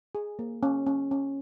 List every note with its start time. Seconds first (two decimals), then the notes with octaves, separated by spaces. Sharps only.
0.15 G#4
0.39 A#3
0.63 C#4
0.86 C#4
1.11 C#4